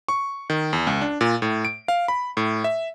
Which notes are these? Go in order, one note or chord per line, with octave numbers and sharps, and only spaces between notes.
C#6
D#3
E2
C#2
D4
A#2
A2
D7
F5
B5
A2
E5